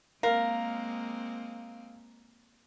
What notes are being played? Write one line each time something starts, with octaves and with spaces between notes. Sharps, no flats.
G#3 A#3 C4 A#4 F5